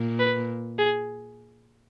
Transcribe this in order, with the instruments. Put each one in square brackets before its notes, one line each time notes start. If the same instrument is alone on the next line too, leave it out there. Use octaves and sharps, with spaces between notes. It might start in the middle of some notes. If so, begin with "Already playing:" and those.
Already playing: [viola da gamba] A#2
[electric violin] B4
G#4